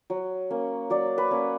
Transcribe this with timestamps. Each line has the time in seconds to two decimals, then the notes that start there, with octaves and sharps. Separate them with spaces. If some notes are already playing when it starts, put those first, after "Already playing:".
0.10 F#3
0.50 A#3 C#4
0.90 F#3 D5
1.18 B4
1.31 A#3 C#4